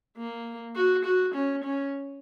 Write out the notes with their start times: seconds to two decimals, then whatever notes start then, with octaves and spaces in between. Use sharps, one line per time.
0.17 A#3
0.76 F#4
1.05 F#4
1.35 C#4
1.64 C#4